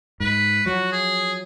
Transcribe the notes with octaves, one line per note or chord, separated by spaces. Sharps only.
G#2 B4
F3 F#3 F#4
G#4